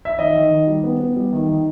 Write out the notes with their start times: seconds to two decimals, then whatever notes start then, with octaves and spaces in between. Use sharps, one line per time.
0.05 E5
0.19 D#3 D#5
0.35 D#3
0.51 D#3
0.67 G3
0.84 B3
1.00 B3
1.16 G3
1.33 D#3
1.49 D#3